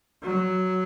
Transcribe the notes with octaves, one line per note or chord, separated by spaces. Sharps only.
F#3